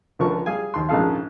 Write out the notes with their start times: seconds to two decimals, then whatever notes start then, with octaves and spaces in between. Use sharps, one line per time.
0.19 C#2 D3 F3 A#4 C#6
0.46 G3 G#4 F5 G#5
0.74 D#2 C6
0.89 A#1 G#2 C#3 G#4 A4 F5